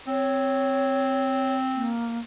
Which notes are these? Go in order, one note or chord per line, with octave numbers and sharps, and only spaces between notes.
C4 C#5
A#3